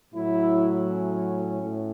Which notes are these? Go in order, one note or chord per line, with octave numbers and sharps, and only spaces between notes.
A2 F#3 E4
C#4
A2